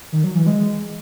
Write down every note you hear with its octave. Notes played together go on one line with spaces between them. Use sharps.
D#3
F#3
E3
G#3